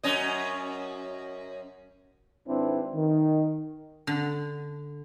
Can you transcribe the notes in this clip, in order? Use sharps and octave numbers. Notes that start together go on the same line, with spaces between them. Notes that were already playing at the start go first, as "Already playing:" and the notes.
F#2 C#4 D#5
G#1 C4 D4 E4 B4
D#3
D3